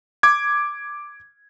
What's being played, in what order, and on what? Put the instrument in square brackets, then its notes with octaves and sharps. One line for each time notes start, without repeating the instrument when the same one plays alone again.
[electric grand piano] D6 G#6